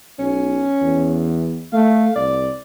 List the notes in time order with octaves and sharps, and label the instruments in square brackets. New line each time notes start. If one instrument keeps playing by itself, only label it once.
[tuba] B1 [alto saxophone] C#4
[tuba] E2
[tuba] A3 [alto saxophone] F5
[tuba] C2 [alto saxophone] D5